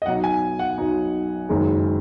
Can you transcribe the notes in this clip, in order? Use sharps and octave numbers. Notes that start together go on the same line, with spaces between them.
D#5
B1 B2 F#3 D#4 F#5
G#5
F#5
B1 B2 F#3 D#4
F#1 F#2 D#3 G#3 D#4